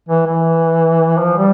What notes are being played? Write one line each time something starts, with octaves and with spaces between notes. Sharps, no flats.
E3
E3
F3
G3